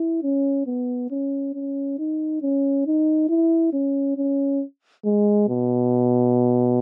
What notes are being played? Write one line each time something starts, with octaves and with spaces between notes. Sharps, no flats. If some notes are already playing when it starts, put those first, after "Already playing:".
Already playing: E4
C#4
B3
C#4
C#4
D#4
C#4
D#4
E4
C#4
C#4
G#3
B2